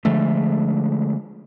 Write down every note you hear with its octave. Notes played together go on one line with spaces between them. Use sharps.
D3 F3 G#3 A3